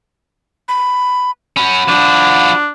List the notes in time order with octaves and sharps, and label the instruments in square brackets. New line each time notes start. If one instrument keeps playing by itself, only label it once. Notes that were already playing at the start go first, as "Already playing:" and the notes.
[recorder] B5
[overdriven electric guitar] C#4 F#4 [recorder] B5
[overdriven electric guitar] F3 F#4 [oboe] D4